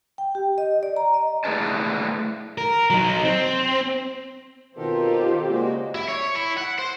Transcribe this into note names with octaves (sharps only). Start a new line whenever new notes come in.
G5
G4
D#5
D5
A#5
D#5
A3 E4 G#4 B4 D5 A5
A#4
F#3 D#4
C4
B2 D#3 C4 F4 G4 A4 A#4 C5
C#3 G#3 A#3 C#4 F#4 D5
E4
C#5
E4
F#5
C5